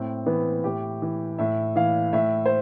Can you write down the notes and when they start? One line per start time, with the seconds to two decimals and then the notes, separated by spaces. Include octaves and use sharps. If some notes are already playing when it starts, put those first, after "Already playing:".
Already playing: A2 C4
0.26 E3 B3
0.64 A2 G4
1.02 E3
1.39 A2 E5
1.76 E3 F5
2.13 A2 E5
2.46 C5